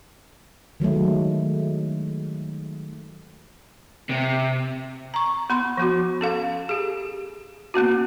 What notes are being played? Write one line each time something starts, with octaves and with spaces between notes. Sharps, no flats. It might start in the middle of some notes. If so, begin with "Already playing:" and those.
D#3 F#3 G#3 A3
C3
A#5 C#6
B3 B5 C6
F3 B3 F#4
C#4 A4 F5
G4 G#4
A#3 B3 C#4 F#4